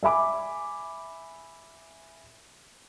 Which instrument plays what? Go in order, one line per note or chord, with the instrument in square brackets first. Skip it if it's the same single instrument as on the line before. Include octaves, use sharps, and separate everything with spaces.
[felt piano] E5 G#5 B5 D6